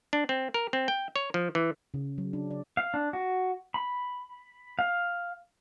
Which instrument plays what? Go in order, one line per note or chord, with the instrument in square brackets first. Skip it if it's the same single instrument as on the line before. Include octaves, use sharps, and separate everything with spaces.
[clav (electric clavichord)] D4
C4
A#4
C4
G5
C#5
F3
E3
[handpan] C#3
F#3
D4
D5
[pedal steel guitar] F5
D4
F#4
B5
F5